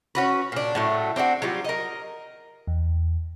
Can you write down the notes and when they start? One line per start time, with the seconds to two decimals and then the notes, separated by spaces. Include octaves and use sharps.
0.15 C#4 F#4 B4
0.52 A#2 D4
0.75 A2 F#3 A3
1.16 C4 D4 E4 F#4
1.42 F#3 G3 F4
1.64 A#4 D#5
2.67 E2